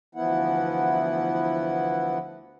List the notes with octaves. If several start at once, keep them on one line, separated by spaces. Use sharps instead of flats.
D2 E3 F3 B3 E4 F#5